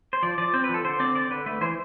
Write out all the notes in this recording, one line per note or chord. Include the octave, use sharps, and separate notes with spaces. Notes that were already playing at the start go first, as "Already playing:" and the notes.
C5
F3 D5
F3 D5
C4 C5
B4
F3 A4
D3 C5
C4 D5
D3 D5
D3 B4
A3 B4
E3 C5